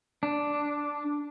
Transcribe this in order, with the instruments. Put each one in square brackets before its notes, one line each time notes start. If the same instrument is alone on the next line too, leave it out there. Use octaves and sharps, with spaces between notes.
[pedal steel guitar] D4